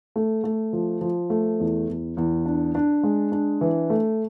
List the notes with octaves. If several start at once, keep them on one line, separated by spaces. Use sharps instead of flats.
A3
A3
F3
F3
A3
E2
E2
E2
D4
D4
G#3
D4
E3
A3